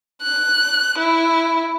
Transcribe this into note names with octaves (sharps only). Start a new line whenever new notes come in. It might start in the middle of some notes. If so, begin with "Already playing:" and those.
F#6
E4